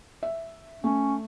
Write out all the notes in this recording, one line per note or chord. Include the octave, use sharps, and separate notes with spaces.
E5
A3 C#4